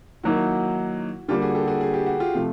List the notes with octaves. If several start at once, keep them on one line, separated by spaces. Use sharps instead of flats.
D#3 F#3 A#3 D#4 E4 F#4
D3 G3 A#3 F4 G4
F#4 G#4
G4 A4
F#4 G#4
G#4
G4
F#4
F4 G4
C3 F3 A3